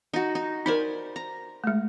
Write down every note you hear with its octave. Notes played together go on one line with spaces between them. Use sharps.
D#4 F#4
D#4
D#4 A#4 C5 D5 G#5
A#5
G#3 A3